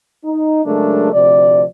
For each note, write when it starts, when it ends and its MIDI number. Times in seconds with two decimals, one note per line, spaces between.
0.24 0.64 63
0.65 1.11 49
0.65 1.11 54
0.65 1.11 56
0.65 1.11 57
0.65 1.11 62
0.65 1.11 70
1.13 1.64 38
1.13 1.64 48
1.13 1.64 53
1.13 1.64 74